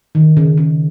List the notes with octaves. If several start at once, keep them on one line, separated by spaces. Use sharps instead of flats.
D#3
C#3
C#3